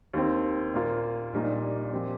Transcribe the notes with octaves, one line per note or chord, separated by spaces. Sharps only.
D#2 D#3 C4
A#2 A#3 F4
A#1 A#2 G3 D#4
A#2 F3 C4 G4